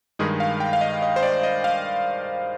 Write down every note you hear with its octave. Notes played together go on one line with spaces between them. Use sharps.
G2 D#3 G#3 G#4
F5
G5
F5
D#5
D#5
C5
D5
D#5
F5